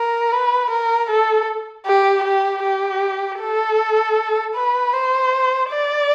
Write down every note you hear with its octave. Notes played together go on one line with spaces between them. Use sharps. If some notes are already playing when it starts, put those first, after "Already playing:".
Already playing: A#4
B4
A#4
A4
G4
G4
G4
A4
B4
C5
D5